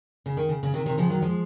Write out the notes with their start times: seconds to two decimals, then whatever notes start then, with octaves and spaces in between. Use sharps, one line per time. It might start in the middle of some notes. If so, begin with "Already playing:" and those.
0.26 C#3
0.37 D#3
0.48 C#3
0.63 C#3
0.74 C3 D#3
0.86 C3 D#3
0.98 C#3 F3
1.10 D#3 F#3
1.22 F3 G#3